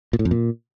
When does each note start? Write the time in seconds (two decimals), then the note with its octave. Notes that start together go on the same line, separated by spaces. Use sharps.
0.13 A#2
0.19 A2
0.25 F2
0.31 A#2